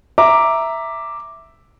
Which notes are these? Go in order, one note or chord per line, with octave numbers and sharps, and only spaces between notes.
E5 A#5 D6